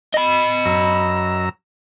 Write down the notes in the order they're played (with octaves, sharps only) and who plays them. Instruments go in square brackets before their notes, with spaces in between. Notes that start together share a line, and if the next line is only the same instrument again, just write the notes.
[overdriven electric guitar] D#5 B5
[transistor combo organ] F#2 A#5 E6